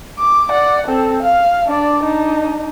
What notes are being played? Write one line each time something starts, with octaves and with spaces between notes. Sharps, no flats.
D6
D5 F#5
C4 A4
F5
D4 D5
D4 D#4